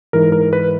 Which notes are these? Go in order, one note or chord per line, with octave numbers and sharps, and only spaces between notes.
G#2 E3 A#4
A#4
B4